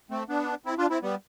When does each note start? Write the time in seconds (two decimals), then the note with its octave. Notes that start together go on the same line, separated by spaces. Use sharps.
0.11 A3 C4
0.29 B3 D4
0.66 C4 E4
0.78 D4 F4
0.90 C4 E4
1.02 G3 B3